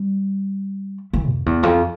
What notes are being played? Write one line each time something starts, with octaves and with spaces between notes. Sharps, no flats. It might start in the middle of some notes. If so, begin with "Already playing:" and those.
Already playing: G3
E3
F2
E2
F2